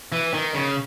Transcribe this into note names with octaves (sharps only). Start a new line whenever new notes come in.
E3
D#3
C#3